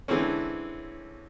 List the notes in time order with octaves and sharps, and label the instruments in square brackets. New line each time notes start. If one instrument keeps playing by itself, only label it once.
[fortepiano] D3 E3 G#3 C4 C#4